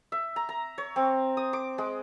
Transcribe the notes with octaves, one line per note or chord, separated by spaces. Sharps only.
E5
A#5
A#5
C#5
C4
D#6
D6
G#3